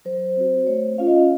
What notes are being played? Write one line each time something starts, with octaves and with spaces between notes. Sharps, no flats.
F#3 C5
C4 F#4
A3 C#5
C#4 F4 F5
D#5
F5